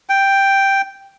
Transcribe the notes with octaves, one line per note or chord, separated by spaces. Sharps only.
G5